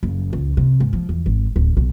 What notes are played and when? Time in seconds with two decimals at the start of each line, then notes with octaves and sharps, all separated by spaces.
0.03 F#1
0.33 C#2
0.57 C3
0.80 G#2
0.93 F3
1.09 E2
1.26 G#1
1.56 D1
1.77 B1